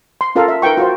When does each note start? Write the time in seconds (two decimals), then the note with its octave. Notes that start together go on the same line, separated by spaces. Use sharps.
0.21 C6
0.35 C#4 F4 A4 A#4 F5
0.48 E5
0.62 D#4 A#4 B4 G5 C#6
0.77 F4 F#4 C5